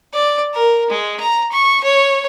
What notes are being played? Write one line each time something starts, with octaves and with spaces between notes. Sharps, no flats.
D5
A#4
G#3
A#5
C#6
C#5